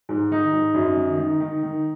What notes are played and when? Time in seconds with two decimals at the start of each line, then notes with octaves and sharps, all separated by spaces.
0.09 G#2
0.31 D#3 D#4
0.53 G#2
0.74 F#2
0.97 D#3
1.18 D#3
1.40 D#3
1.63 D#3